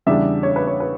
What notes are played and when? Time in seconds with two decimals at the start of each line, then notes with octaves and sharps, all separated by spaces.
0.06 E2 C#3 G3 D4 E5
0.43 C#5
0.56 B4
0.67 C#5
0.80 B4